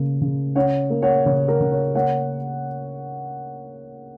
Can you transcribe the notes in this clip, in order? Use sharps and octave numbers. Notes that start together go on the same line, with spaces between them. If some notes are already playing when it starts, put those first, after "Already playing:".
Already playing: C#3 A#3
C#3
C#4 C#5 F#5
A#3
C#5 F#5
C#3 C#5
A#4
C#3
C#5
A#3 C#5 F#5